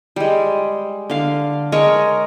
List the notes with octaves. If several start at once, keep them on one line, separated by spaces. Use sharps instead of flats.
G3 G#3
D3 F5
G#3 A#4 C#5 C#6